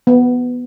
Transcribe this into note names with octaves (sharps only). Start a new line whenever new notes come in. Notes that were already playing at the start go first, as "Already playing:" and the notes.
B3